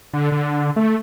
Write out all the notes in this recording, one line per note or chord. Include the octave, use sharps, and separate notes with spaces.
D3
D3
A3